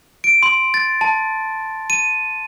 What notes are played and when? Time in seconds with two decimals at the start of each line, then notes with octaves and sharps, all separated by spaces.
0.24 D7
0.43 C6
0.74 A6
1.01 A5
1.90 D#7